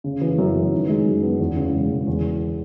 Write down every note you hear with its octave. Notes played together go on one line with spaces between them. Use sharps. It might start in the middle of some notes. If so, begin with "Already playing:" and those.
C#3
E3
F#2
F#2
D#3
G#3
F#2
B3
E2
C#3
E1
E1
E2